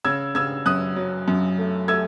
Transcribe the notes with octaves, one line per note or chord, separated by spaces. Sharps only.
C#3 E6 G#6
C#3 E6 G#6
F#2 D#6 F#6
F#3
F#2
A3
A3 E6 G#6